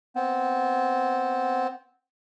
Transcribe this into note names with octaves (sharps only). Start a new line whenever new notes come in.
B3 C4